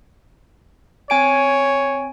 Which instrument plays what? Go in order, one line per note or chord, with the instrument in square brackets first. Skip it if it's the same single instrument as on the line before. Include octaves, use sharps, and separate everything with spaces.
[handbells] C4 G#5 D7 [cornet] C#5